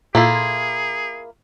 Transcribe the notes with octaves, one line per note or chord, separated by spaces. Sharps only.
A#2 A#3 E4 F4 G#4 A4 C6